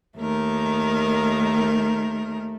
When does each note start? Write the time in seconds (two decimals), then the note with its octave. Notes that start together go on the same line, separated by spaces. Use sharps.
0.19 D#2 D#3 A3 A#4